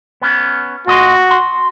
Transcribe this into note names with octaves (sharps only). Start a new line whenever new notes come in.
B3 C#4
A#2 F#4 D#5 C6
C6